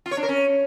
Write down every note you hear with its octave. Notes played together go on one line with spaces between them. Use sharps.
F4
C#5
D4
A#4
C#4